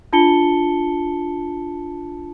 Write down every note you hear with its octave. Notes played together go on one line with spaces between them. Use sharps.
D4 F4 A5 C#7 G7